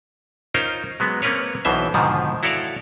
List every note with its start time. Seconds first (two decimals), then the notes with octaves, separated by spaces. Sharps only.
0.54 C#4 D#4 F4 A#4 C5
1.00 F#3 G#3 B3
1.22 A#3 C4 C#4 A#4 B4 C#5
1.65 B1 B2 E3 C5 E5
1.94 G#2 B2 D3 D#3 F3
2.43 E4 F#4 A4 C#5 D5 F5